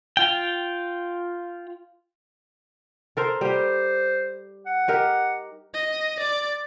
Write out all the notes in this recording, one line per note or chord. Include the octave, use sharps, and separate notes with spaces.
F4 G5
A4 A#4 C5
G3 G4 C5
F#5
D#4 G4 A#4
D#5
D5